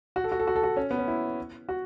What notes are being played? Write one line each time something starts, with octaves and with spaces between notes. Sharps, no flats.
F#4
A4
F#4
A4
F#4
A4
F#4
C#4
B3
C#4
E4
F#4